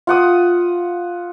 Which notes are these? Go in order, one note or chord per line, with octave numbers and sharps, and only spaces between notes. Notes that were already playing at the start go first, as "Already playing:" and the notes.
F4 F#5 D#6